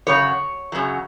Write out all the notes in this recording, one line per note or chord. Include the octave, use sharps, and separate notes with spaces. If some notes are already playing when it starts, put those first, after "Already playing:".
F#2 C#3 F#3 C#5
F#2 C#3 F#3